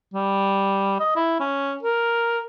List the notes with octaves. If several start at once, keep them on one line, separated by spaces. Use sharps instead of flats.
G3
D#5
E4
C#4
A#4